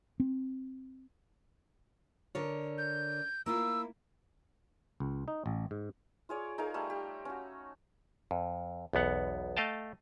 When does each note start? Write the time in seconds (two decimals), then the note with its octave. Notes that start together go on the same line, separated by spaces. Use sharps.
0.20 C4
2.35 D3 A#4 C#5
2.78 G6
3.46 A#3 E4 F4 E6
5.00 C#2
5.28 D#4
5.46 A1
5.71 G#2
6.29 F4 G#4 C#5 D5
6.58 D#4 G#4 A#4 F5
6.74 G3 A3
6.90 G4
7.25 C#4 F#4
8.31 F2
8.93 B1 E2 B3 F#5
9.57 A3 D#5 F5 G5 A5